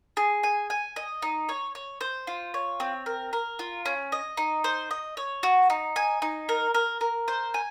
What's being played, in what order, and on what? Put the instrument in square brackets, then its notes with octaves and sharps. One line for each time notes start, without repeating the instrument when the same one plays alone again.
[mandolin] G#4
G#5
G#5
D#5
D#4
C#5
C#5
C5
F4
C#5
C4
A#4
A#4
F4
C#4
D#5
D#4
C5
D#5
C#5
F#4
D#4
G#5
D#4
A#4
A#4
A#4
C5
G#5